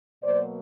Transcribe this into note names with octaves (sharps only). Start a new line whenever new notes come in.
B2 F#3 A#3 C5 D5